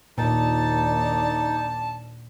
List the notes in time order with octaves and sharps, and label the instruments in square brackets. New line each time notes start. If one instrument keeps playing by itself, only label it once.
[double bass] D#2 D4 [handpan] A#2 [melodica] D#4 [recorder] A5